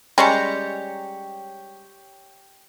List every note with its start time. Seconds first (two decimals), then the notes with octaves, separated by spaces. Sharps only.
0.18 G3 G#3 C#4 G4 C#5 A#5